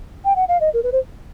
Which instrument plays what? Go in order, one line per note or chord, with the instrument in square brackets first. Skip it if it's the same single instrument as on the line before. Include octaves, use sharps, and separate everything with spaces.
[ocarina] G5
F#5
F5
D#5
A#4
B4
C5